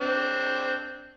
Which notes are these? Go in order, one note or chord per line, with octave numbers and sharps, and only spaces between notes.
C4 D4